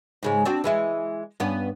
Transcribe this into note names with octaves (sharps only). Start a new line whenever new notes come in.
G#2 C#3 G#3
C4 D4 F#4
E3 G#3 E4
G2 B3 C#4